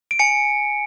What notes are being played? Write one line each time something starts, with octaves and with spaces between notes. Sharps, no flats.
D7
G#5 C#7